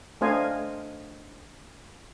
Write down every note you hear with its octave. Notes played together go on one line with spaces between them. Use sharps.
A3 D4 C5 D#5 F5 G#5